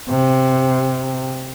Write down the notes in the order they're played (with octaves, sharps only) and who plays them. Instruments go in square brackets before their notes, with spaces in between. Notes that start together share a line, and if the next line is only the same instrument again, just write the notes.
[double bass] C3